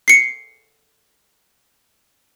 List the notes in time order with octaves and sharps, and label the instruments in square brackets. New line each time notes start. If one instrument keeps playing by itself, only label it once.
[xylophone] C7 C#7